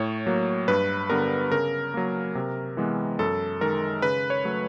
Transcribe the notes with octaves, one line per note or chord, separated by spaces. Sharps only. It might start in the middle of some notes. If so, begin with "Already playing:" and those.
Already playing: A2 C#5
F#3 A#3
G2 B4
D3 G3 B3 A#4
C#3 A#4
F#3 A#3
C3
E3 G#3 B3
F#2 A4
D#3 G#3 A#4
C#3 B4
C#5
F#3 A3